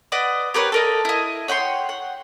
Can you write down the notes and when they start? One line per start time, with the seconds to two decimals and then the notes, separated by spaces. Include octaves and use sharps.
0.12 B4 D5 D#5 F#5
0.54 G4 A#4 B4 C#5
0.72 A4 A#4 D#5
1.05 E4 D#5
1.48 C#5 F#5 G5 C6
1.89 F#5